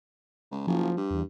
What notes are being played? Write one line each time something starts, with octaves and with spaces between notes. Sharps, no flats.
C#2
F#1 F3
G2
E2